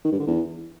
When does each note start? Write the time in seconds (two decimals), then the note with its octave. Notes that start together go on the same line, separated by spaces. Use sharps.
0.04 D#3
0.12 G2
0.19 D3
0.27 E2